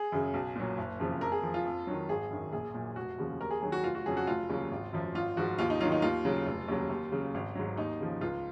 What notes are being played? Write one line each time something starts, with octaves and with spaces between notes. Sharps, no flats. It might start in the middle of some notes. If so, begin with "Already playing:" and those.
Already playing: G#4
F#2 C#3
B1
A#2 F#3
F#1
F2 C#3 F3
F2 A#4
G#4
F3
F4
F2
D#3 F#3
G#1 G#4
F#2 D#3
A#1 G#4
A#2 F#3
F1 F#4
D#2 C#3 F3
D#2 A#4
G#4
D#3 F#3 G#4
F#4
F1 F4
F#4
F2 C#3 F#3 G#4
F#4
F1 F4
D#2 C#3 F#3
G#1
F#2 F3
G#1 F4
G#2 F3 F#4
D#2 F4
D#4
D#3 F#3 F4
D#4
D#2 F4
C#3 F#3
F1
D#2 C#3 F#3
D#2
C#3 F#3
G#1
G#2 F#3
D#2 D#4
C#3 F3
C#2 F4